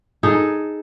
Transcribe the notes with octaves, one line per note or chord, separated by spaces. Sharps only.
D#4 G#4 A4